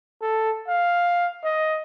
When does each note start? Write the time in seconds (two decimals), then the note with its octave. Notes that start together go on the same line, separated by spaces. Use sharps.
0.22 A4
0.68 F5
1.44 D#5